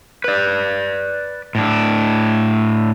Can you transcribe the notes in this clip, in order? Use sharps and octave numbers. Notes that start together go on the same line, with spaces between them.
B4 D5
A2 D4